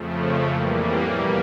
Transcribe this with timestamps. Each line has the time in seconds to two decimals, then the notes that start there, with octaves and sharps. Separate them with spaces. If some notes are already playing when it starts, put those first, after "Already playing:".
Already playing: F2 C#3 F3 A3
0.49 A2 E3 G3 A#3
1.10 E2 B2 G3 A#3